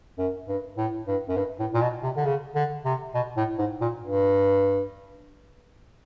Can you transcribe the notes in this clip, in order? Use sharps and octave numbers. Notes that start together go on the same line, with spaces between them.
F#2
G2
A2
G2
F#2
G2
A2
A#2
B2
C3
D3
C#3
D3
C3
B2
A2
G#2
A#2
G2